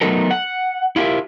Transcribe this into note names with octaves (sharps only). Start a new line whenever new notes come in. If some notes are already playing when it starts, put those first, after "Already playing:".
F#3 A3 B3 D#4 A4 A#4
F#5
E4 F4 G4 A#4 E5